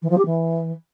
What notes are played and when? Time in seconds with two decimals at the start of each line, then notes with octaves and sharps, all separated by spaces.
0.02 E3
0.10 F3
0.18 G4
0.26 E3